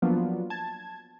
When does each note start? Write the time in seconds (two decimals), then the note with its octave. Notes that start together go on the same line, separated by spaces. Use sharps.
0.02 F3 F#3 A#3 B3 D4 F4
0.50 A5 G#6